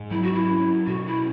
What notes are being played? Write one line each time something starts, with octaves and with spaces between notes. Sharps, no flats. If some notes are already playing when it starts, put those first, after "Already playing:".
Already playing: G#2
F#3 E4
F#4
E4
C#4
B2 F#4
E4